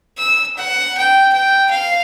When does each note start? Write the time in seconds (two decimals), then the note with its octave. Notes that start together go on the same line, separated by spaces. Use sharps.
0.18 E6
0.57 F#5
0.97 G5
1.33 G5
1.71 F5